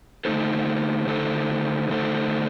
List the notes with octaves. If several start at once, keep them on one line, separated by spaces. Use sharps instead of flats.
D3 A3 D#4 A4 C5
D3 A3 D#4 A4 C5
D3 A3 D#4 A4 C5